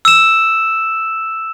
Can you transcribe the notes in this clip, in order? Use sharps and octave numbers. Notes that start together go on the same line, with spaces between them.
E6 E7